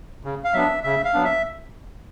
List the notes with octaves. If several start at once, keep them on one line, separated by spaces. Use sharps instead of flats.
C#3
F5
F#3 B3 D4 E5
C#3 E5
F5
F#3 B3 D4
E5